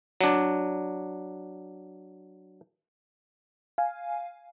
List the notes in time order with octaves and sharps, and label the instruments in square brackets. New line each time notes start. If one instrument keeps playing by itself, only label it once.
[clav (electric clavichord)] F#3 D4
[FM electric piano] F5 G#5